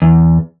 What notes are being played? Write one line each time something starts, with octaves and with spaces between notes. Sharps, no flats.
E2